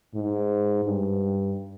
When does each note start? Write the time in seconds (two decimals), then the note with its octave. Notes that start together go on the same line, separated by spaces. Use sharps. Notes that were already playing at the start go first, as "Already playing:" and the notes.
0.15 G#2
0.85 G2